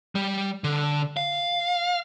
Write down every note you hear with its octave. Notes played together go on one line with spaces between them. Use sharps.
G3
D3
F5